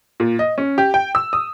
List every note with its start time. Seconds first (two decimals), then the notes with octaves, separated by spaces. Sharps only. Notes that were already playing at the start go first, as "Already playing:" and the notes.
0.20 A#2
0.39 D#5
0.58 C#4
0.78 G4
0.94 G5
1.15 E6
1.33 D#6